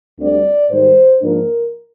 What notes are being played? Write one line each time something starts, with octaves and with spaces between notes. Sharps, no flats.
D2 D3 G3 C4 D5
G#2 D#3 G3 C5
G#2 F3 A#3 D4 A#4